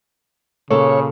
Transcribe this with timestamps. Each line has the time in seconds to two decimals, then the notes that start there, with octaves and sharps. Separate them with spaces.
0.71 A#2 C#3 A4 C#5